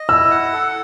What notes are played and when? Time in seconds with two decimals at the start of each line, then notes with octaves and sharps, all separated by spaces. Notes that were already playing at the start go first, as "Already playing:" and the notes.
Already playing: D#5
0.09 E4 E6
0.31 F#5
0.53 A4